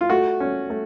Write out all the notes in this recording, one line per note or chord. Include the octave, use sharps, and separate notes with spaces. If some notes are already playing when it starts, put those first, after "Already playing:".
F4
A3 F#4
C#4
A3